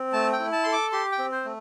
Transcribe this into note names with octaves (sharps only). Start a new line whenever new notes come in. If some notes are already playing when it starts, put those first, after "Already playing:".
Already playing: C4
A3 A5
G5
E4
A5
A4 C6
D6
G4 C6
G5
C4
C5
A3